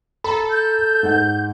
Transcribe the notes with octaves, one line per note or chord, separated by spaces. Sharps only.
A4 A#5 B5
G6
G#2 F#5